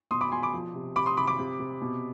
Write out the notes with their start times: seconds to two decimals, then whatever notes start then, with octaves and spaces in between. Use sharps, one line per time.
0.11 B2 C6 D#6
0.21 B5 D6
0.32 B2 G#5 C6
0.43 B5 D6
0.53 F3
0.74 C3
0.96 C3 B5 D6
1.06 C6 D#6
1.17 C3 B5 D6
1.27 B5 D6
1.39 C3
1.59 C3
1.81 B2